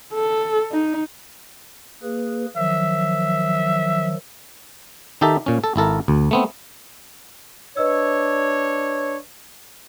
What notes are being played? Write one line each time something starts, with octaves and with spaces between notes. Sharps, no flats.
A4
D#4
A#3 G#4 B4
D#3 F3 F#3 E5
D#3 D#4 G4 A4 E5
A#2 C#4
A4
G#1 E4 A4 A#4
D2
A3 B3 C4
D4 B4 C#5 D#5 E6